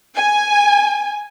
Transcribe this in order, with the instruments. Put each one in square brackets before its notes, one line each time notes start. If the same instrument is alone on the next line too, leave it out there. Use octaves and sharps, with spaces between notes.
[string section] G#5